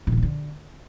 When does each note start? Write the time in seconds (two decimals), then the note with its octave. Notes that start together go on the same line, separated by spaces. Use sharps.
0.07 A#2
0.12 D3
0.17 C3
0.23 D3